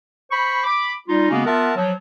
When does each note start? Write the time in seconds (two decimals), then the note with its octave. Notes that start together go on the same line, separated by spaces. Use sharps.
0.31 C5 B5 C#6
0.64 B5 D6
1.08 G3 D#4 F4
1.30 C#3 G#3 A#3 B3 C#4 F#4
1.45 B3 F4 A#4 E5 F#5 A5
1.76 F3 F#3